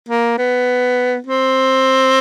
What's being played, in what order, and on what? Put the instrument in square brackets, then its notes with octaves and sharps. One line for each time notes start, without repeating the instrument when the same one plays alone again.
[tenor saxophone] A#3
B3
C4